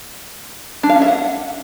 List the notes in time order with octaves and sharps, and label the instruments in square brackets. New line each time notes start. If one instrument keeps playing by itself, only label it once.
[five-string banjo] D4
F5
C#4
E5
F#5